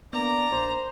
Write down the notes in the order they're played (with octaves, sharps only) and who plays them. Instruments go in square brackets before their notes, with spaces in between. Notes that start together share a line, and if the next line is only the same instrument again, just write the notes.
[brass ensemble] A#3 D4 D5 [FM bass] B3 [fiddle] A#5
[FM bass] A#1 [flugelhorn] C5